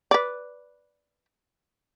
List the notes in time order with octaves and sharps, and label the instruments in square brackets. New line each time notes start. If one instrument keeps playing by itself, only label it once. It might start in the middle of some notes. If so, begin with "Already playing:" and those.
[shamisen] B4 D5